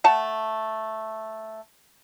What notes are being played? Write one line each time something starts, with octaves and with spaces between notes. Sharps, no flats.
A3 F#5 A5